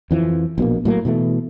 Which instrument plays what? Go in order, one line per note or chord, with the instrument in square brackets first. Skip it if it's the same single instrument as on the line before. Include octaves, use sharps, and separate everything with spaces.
[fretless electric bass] F2 E3 F3
A#1 B2 A#3
A2 F#3 A#3
B2 E3 G#3 A3